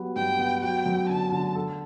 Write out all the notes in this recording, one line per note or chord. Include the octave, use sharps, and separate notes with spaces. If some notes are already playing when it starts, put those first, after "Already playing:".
Already playing: F#3 G3 B3
G2 G5
B3
F#3 G5
F#2
D3 A5
D3
A4